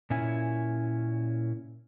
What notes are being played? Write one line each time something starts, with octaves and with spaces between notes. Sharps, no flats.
A#2 C#4 E4 G#5